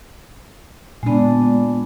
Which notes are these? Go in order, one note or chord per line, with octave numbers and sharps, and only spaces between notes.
A#2 G#3 B3 D4